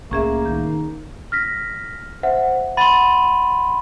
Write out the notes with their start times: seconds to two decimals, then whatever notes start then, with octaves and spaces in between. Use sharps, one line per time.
0.11 C2 A2 A#3 C#4 G#4 E5
0.45 D#3 G6
1.32 F6 A#6 B6
2.23 C5 E5 F#5
2.77 F#5 B5 C6 A6 D#7